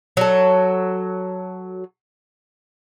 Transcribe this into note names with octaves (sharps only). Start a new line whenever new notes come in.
F#3 A4